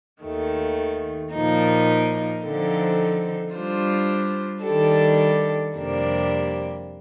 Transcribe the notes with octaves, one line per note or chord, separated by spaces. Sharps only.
D#2 D#3 A3
A#2 F3 A#3 D#4
D3 F3 C4 D#4 A4
G3 D4 F4 C5
D#3 G3 D4 A4
F2 C3 G3 A#3 D4